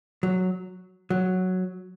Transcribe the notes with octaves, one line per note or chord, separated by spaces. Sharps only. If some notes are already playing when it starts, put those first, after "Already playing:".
F#3
F#3